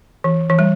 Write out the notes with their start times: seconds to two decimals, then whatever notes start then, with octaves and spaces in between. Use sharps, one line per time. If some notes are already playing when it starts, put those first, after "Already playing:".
0.24 E3
0.50 E3
0.59 G3